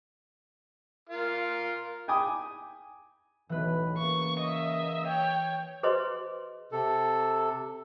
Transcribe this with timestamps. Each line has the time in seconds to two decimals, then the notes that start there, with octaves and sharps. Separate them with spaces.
1.09 F4 A#4
2.08 G5 G#5 B5 D6 D#6
3.49 B1 E2 A2 E3 B4
3.98 C#3 A#3 C#6
4.41 D#5 E5
5.07 C#5 G5
5.83 G#4 B4 C5 D#5 C6
6.72 C3 A4